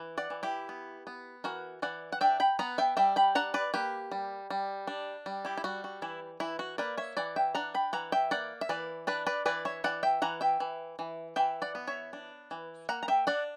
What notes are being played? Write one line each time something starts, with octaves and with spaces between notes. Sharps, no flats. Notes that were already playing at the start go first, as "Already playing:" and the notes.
Already playing: E3
D5 F#5
E3
E4 G4
B3
B3
E3 F#4 A#4
E3 D5 F#5
F#5
D4 E5 G5
G5 B5
B3 F#5 A#5
E5 G5
G3 E5 G5
G5 B5
D4 F#5 A#5
B4 D5
A#3 G4 B4
G3
G3
D4
G3
E4 G4
E4
G3 F#4
F#4
E3 E4
E3 E4
F#4
A#3 B4 D5
C#5 E5
E3 D5 F#5
E5 G5
D4 F#5 A#5
G5 B5
E3 F#5 A#5
E5 G5
A#3 D5 F#5
E5
E3 B4 D5
D4 B4 D5
B4 D5
E3 B4 D5
C#5 E5
E3 D5 F#5
E5 G5
E3 F#5 A#5
E5 G5
E3
E3
E3 E5 G5
D5 F#5
B3
C#5 E5
D4
E3
A#3 F#5 A#5
A#5
E5 G5
D4 D5 F#5